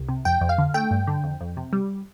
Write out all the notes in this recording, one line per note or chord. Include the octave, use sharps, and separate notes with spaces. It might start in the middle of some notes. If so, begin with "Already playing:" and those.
Already playing: C2
C3
F2 G5
F2
F5
D3
A3 G5
G2
D3
F2
F2
C3
G3